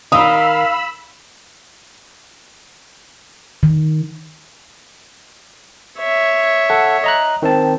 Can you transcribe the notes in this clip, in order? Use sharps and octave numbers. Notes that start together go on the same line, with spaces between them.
D#3 D#4 F5 B5 D#6 E6
D#3
C#5 E5
A4 F#5
D#5 A#5 F#6
D#3 C4 A5